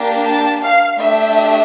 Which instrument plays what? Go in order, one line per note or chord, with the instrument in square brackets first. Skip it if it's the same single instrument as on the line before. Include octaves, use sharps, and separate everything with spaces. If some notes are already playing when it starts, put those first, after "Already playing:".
Already playing: [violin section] A#3 D4 G4
A5
F5
A3 D4 G4 E5